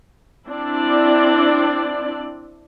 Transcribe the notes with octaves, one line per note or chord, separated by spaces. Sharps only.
C4 D4 E4 D5